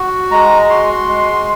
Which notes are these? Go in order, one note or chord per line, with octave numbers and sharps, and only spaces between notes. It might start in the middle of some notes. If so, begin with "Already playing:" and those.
Already playing: F#4
G#3 A#5
F#4 C6
G#3